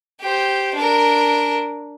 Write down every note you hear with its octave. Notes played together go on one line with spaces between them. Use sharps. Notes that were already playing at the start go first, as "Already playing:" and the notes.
G4 C5
D4 A#4